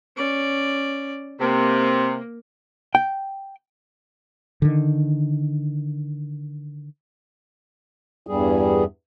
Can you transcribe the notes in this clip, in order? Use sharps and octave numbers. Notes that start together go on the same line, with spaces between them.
C#4 D5
C3 A#3
G5
D3 D#3
E2 G2 G3 G#4